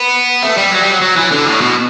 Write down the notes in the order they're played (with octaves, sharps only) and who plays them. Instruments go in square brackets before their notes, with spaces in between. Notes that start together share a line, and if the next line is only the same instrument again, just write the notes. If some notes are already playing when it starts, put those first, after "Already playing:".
Already playing: [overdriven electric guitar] B3
A3
G3
F#3
G3
F#3
F#3
E3
D3
A2
B2